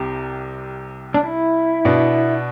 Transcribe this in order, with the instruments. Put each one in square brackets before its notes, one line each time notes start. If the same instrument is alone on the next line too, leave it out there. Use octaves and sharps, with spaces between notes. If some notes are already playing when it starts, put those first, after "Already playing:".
Already playing: [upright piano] C2 C3 [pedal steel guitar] G4
[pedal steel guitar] D4
E4
[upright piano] B2 B3 D4